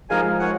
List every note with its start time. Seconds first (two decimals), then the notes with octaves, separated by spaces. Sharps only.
0.10 F3 G#3 D#4 A#4 F5 G#5
0.40 C#5 F#5